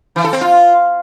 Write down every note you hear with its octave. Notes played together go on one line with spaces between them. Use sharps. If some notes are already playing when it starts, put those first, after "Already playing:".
E3
A4
C4
F4